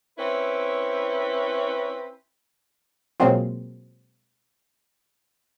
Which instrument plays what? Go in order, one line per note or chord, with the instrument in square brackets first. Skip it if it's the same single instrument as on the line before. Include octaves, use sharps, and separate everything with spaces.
[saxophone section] C4 C#4 E4 B4
[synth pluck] B2 F#3 G#3 A#3 C4 F4